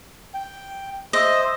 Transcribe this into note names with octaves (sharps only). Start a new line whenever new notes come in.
G5
C5 D#5 E5